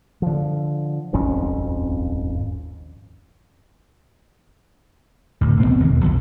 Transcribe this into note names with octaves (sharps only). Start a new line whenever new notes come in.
D3 F3
D#1 G#1 F2 C#4
D1 D2
D#1 B2 B3 C4
E1 D#2 D#3
B1 F2 F#3